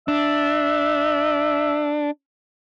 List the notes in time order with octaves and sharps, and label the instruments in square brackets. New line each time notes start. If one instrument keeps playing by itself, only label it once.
[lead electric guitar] D4 [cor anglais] E5